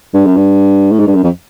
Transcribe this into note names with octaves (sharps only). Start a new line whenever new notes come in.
G2
F#2
G2
A2
G#2
G2
F#2
F2